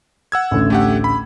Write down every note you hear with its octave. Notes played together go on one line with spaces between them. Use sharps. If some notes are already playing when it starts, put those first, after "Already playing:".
F#5 E6 G#6
A1 D2
A3 G4 F#5
B5